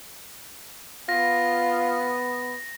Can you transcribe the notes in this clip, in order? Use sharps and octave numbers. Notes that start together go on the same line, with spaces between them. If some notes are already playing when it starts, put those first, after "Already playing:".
B3 F4 A#6